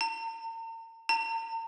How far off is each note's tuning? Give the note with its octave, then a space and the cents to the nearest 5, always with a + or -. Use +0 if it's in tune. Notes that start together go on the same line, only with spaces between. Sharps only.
A#5 -45
A#5 -45